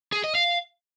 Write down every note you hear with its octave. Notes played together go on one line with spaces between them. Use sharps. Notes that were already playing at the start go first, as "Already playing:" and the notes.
G#4
D#5
F5